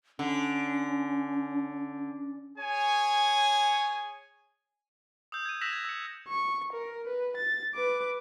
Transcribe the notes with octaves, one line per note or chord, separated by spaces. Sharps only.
D3 C#4
G#4 C#5 G#5
D#6 E6 G6
G#6 D#7
E6 F#6 A#6 B6 E7 F7
G#6
E6 C#7
C#6
A#4
B4
A6
B4 D6